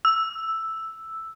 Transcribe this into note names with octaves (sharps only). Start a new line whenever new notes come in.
E6